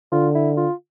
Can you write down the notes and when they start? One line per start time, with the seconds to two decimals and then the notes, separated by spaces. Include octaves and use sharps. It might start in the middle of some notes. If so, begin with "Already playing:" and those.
0.12 D3 F4
0.35 E4
0.57 F4